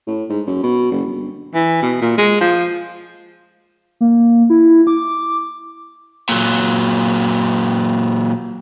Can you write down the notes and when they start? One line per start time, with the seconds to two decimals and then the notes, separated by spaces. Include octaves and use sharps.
0.07 A2
0.30 G#2
0.47 F#2
0.63 B2
0.91 F#1
1.06 G1
1.54 E3
1.82 B2
2.01 A#2
2.18 G#3
2.40 F3
4.01 A#3
4.50 E4
4.87 D6
6.29 A#2 F#3